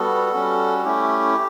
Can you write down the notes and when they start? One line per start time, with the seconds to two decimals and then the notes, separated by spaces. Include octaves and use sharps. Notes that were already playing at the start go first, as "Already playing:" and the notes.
Already playing: G3 B3 F#4 A4
0.33 G3 C#4 F#4
0.84 A3 C#4 E4 G4